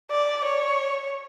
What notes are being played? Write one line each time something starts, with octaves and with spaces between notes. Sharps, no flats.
D5
C#5